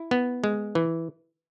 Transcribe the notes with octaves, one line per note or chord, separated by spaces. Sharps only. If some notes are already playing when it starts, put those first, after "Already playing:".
Already playing: E4
B3
G#3
E3